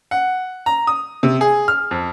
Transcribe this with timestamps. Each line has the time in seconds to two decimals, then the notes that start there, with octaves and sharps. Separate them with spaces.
0.11 F#5
0.66 A#5
0.87 D#6
1.23 C3
1.41 G#4
1.68 F6
1.91 F2